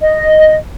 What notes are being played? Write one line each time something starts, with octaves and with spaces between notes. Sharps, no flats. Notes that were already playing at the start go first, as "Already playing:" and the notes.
D#5